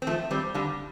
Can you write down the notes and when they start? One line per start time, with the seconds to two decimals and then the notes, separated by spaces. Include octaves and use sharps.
0.02 C4
0.07 F3 A3
0.31 G3 C4
0.54 D3 G3